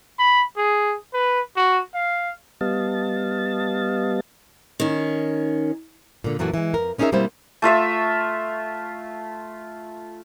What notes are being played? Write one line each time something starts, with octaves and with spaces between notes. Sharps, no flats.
B5
G#4
B4
F#4
F5
G3 B3 D#5 F5 A5 A6
D#3 C#4
A#2 D3
F#2 A#2 E3 A3 F#4
E3 G#3
F2 A#4
B3 C#4 D#4 G#4 A#4 E5
B2 G3 A#3 C4 E4 C5
A3 F4 E5 E6